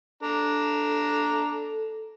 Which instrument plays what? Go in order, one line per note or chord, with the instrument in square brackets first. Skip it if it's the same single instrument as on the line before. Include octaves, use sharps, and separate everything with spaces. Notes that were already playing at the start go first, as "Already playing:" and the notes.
[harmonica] D4 A#5 [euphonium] A4